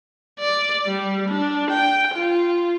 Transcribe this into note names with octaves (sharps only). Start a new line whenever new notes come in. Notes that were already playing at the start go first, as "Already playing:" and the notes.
D5
G3
D4
G5
F4